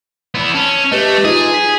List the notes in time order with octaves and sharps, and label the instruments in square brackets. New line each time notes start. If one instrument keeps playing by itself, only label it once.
[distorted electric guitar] B3 E4
[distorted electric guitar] C#4 [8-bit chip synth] A5
[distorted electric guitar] A3 [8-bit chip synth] G4 B4 D#5
[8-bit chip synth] D#4 F4 [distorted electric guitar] G#4
[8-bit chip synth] B6